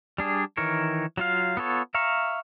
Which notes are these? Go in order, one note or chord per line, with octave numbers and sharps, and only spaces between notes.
G3 D4 G#4
D#3 E3 A#4 C#5
F#3 F4 F5
B3 F4 A4 C#5
E5 F5 A#5 C#6